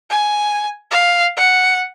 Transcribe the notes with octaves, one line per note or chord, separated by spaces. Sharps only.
G#5
F5
F#5